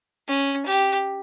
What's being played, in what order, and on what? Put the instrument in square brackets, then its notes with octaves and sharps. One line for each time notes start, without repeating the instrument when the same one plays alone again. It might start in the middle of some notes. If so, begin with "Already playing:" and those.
[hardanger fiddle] C#4
G4